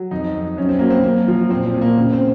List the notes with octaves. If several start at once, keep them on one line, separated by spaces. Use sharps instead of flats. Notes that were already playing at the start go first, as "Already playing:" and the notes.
Already playing: F#3
F2 D#4
F2
F#2 C#4
C4
F#3 A#3
C4
F#2 A#3
F3
A#2 C4
C4
A#2
A#3
C#3 C4
C4